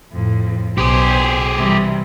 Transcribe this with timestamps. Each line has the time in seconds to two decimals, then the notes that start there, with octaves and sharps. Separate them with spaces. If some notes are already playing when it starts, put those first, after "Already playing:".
0.12 F2 A2
0.78 B1 G4 G#4 C5
1.58 C3 E3 G3